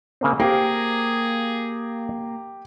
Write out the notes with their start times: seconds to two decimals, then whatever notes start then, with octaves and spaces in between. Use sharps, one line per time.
0.21 C#3 A#3 C4
0.40 A#3 G4 G#4 C5 G5